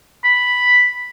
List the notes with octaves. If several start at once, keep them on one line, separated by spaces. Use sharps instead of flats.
B5